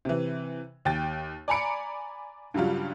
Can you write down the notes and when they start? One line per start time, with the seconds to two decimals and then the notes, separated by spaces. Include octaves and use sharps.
0.05 C3 E3
0.85 D#2 G5 A6
1.48 D5 G#5 A#5 B5 C#7 D7
2.54 G2 C#3 F#3 G3 F4